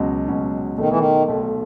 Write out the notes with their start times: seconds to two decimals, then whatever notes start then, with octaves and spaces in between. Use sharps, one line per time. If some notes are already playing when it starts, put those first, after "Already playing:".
Already playing: C#2 B2 F#3 C#4
0.28 C#2 B2 F#3 C#4
0.78 B1 B2 D#3 A3
0.89 E3
0.99 D#3
1.28 B1 B2 A3